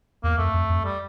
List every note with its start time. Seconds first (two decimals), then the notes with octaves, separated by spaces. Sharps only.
0.23 E2 A#3
0.38 F2 A3
0.54 F2
0.70 F2
0.85 G3